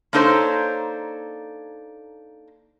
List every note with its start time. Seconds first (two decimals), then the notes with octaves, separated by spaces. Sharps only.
0.13 A#3 D4 D#4 A4 C5 C#5